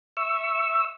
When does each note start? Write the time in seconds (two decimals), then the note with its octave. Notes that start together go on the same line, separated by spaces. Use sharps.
0.17 E5 C#6 E6